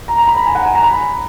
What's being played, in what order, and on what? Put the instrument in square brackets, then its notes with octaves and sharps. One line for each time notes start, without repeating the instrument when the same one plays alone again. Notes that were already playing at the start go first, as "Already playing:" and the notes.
[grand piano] A#5
A#5
B5
A#5
G#5
F#5
G#5
A#5
B5